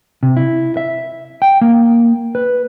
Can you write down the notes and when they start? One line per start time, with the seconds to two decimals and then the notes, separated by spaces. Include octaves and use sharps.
0.23 C3
0.37 E4
0.77 E5
1.42 G5
1.61 A#3
2.35 B4